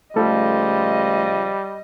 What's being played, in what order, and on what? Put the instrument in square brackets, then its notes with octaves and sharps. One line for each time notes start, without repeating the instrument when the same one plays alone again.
[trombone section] C#2 F3 F4 [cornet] G3 [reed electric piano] A3 D#4 A4 [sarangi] D#5